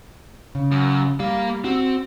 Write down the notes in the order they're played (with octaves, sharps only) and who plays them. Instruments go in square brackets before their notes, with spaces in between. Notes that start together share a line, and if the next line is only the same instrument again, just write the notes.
[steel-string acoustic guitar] C#3
[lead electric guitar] F#2
[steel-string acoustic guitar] G3 [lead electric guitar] A#3 F5
[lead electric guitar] C4 [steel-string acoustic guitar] F#4